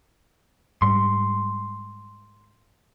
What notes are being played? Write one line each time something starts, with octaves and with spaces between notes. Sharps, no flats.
G#2 G3 C6